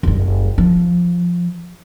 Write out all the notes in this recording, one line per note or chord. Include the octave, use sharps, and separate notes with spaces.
F#1 G3
F3